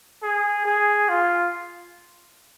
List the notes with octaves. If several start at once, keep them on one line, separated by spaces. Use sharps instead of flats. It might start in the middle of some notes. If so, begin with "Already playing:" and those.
G#4
G#4
F4